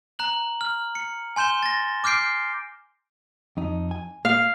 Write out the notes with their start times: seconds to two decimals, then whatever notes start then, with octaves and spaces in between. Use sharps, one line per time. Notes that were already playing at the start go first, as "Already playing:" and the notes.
0.19 A#5 F#6 F#7
0.61 F6
0.95 C#7
1.36 G#5 C6 G6 E7 G7
1.63 A6 A#6
2.04 D6 F6 G6 C7 D7
3.57 F2 D#4
3.91 G#5
4.25 A#3 F5